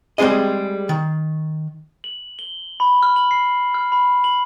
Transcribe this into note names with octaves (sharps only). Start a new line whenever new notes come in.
G3 G#3 C4 G#4 D#5
D#3
F#7
G7
B5
F6
F#7
C7
F6
B5
F#7